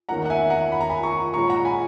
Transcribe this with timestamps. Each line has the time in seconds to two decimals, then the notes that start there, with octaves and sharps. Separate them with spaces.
0.09 E2 D#3 A#3 C#4 F#5 A#5
0.25 F#5
0.30 E5 G#5
0.50 F#5 A#5
0.72 B5
0.81 A#5
0.89 G#5 B5
1.03 A#5 C#6
1.34 A#2 G#3 C#4 A#5 C#6
1.50 F#5 A#5
1.65 G#5 B5